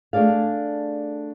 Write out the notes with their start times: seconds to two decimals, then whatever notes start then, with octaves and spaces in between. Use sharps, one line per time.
0.13 A3 D4 G#4 D5 F5